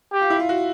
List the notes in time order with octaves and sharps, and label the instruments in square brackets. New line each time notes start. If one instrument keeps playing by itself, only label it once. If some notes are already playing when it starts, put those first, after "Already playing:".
[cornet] G4
[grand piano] F4
E4
F4
F#4